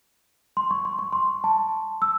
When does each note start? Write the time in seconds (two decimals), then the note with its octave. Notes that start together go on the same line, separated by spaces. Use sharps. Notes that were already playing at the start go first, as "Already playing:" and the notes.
0.57 C6
0.71 C#6
0.85 C6
0.99 C#6
1.13 C6
1.44 A5
2.02 E6